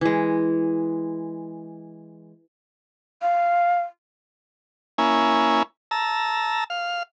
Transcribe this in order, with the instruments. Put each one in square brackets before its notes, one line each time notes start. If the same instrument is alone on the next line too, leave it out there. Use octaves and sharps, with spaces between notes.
[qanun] E3 G#3
[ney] F5
[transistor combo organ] A#3 C#4 E4 G#5
A5 A#5 E6
F5